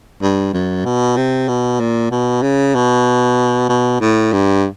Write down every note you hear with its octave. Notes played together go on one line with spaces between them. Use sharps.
G2
F#2
B2
C3
B2
A#2
B2
C#3
B2
B2
A2
G2